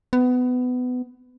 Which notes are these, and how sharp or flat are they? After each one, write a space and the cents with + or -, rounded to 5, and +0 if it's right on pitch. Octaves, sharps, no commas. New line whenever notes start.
B3 +20